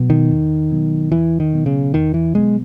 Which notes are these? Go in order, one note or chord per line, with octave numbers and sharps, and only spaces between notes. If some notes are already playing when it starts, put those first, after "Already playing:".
Already playing: B2 F#3 B3
D#3
E2
B2 F#3 B3
E2 E3
D#3
B2 F#3 B3
C#3
E2 D#3
E3
B2 F#3 G#3 B3